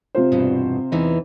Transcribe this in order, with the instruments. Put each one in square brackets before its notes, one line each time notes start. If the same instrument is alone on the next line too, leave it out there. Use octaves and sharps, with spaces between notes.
[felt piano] C3 F4 C5
[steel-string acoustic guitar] E2 G2 B2
E2 E3 D#4